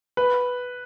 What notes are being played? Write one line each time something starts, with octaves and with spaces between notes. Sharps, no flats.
B4